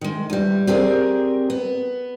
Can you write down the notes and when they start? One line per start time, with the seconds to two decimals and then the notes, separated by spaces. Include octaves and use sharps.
0.01 D#3 G#3
0.30 E2 G3
0.67 C4 G4 G#4 A#4 D5
1.50 B3